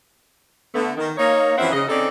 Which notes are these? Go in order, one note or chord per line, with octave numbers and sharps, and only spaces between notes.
D3 A3 B3
D#3
A#3 D#4 C#5
F#2 E3 F3 C4 E5 F#5
C#3 D#5
C4 C#4 D#4 G#4 A4 D5